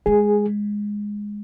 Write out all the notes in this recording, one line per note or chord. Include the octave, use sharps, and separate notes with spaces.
G#3 G#4